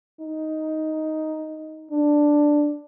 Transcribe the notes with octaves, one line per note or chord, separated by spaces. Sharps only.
D#4
D4